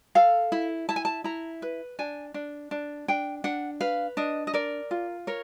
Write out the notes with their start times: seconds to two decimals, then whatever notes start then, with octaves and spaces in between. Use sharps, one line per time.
0.15 A4 F5
0.52 E4
0.89 E4 A5
0.96 G#5
1.05 A5
1.24 E4 A#5
1.62 B4
1.99 D4 G#5
2.34 D4
2.71 D4
3.08 D4 G5
3.44 D4 F#5
3.80 B4 F5
4.17 D4 D#5
4.47 D#5
4.54 A#4 D5
4.91 F4
5.27 A#4 C#5